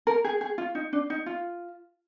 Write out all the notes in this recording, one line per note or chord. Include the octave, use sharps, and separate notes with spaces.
A#4
G#4
G#4
F4
D#4
D4
D#4
F4